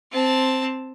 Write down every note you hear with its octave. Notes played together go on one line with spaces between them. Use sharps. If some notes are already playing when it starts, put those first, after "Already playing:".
C4 A5